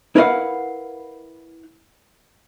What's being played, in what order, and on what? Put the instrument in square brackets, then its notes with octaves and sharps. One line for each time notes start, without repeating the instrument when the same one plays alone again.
[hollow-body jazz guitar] E4 A#4 B4 D#5 F5 F#5